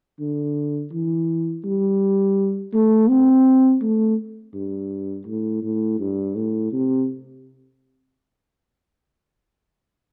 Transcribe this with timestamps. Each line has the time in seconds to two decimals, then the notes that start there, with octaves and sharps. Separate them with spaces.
0.20 D3
0.92 E3
1.65 G3
2.74 A3
3.09 C4
3.82 A3
4.54 G2
5.27 A2
5.63 A2
6.00 G2
6.35 A2
6.72 C3